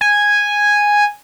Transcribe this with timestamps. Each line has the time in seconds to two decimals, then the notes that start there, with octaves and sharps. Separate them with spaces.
0.01 G#5